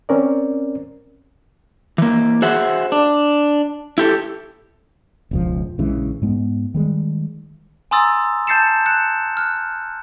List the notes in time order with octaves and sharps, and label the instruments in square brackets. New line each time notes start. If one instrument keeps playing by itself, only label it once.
[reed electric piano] C4 C#4 A#4 D5
[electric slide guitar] E3 A#3
F#4 G#4 C5 E5 F#5
D4
E4 G4 A4
[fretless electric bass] E1 C#2 F3
A#1 C#3 E3 G#3
G#2 G#3 B3
D#3 G3 G#3
[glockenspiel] G#5 A#5 C6 D#6 E6 A6
A5 G6 A6 C7 C#7 E7
F#6 C#7 E7
F6 F#6